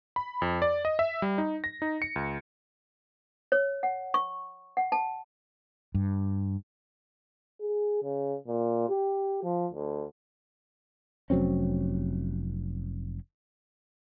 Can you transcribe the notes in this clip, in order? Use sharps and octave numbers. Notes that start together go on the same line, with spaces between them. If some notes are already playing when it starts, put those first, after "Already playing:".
B5
F2
D5
D#5
E5
G3
D#4
A#6
D#4
C#7
C#2
C#5
F#5
C#6
F#5
A5
G2
G#4
C#3
A#2
G4
F3
D2
F1 F#3 C4 C#4